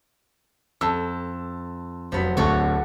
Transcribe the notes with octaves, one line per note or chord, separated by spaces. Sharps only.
F2 A5 E6
F1 F3 F#3 B3 B6
D1 D2 D3 F#4 A4 C#5